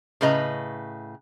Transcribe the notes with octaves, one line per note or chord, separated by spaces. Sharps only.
A2 C#3 B4 D#5 A#5